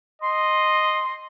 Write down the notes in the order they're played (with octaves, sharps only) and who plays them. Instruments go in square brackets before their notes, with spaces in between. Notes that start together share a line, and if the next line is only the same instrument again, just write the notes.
[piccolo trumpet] D#5 [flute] C6